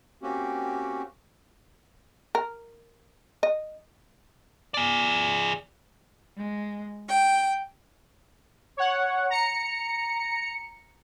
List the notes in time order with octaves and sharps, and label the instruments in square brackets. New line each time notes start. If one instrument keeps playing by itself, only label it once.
[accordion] A#3 C4 C#4 F#4 G4
[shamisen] A#4
D#5
[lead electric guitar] G#4 D5
[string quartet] G#3
G5
[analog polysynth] C#5 F#5
A#5 C#7